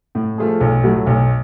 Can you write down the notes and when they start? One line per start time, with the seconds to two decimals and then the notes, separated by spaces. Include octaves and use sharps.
0.15 A2
0.38 F3 A3 F4 G#4
0.61 B1
0.84 A2 F#3 A3
1.07 B1